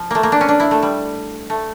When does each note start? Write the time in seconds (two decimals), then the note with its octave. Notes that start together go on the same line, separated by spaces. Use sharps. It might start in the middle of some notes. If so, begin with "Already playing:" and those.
Already playing: F3
0.10 A3 A#3
0.23 A#3
0.32 D4
0.41 C#4
0.48 D4
0.60 E4
0.71 A3
0.82 G3
1.50 A3